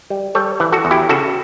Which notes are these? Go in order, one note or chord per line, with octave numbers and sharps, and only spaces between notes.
G3
G3 A4 C#5
E3
F#4 A4
E2
E4 G4
C#3 F#4 A4